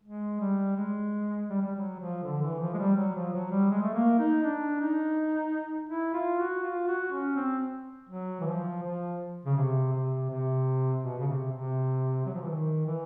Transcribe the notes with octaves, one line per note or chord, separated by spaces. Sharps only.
G#3
G3
G#3
G3
G3
F#3
F3
D3
E3
F3
G#3
G3
F#3
F3
F#3
G3
G#3
A3
A#3
D#4
D4
D#4
E4
F4
F#4
F4
F#4
C#4
C4
F#3
E3
F3
F3
C#3
C3
C3
C3
B2
C#3
C3
C3
F#3
F3
E3
D#3
E3